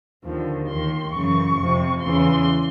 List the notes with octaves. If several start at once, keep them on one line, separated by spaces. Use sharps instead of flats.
D#2 D3 F3
D#2 D#3 C6
F#2 C#3 E3 C#6
F2 C3 F3
E2 C#3 E3 C6